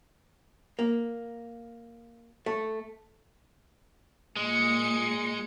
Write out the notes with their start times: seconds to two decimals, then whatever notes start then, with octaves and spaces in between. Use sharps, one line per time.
0.79 A#3
2.46 A3
4.36 A#2 G#3 C#7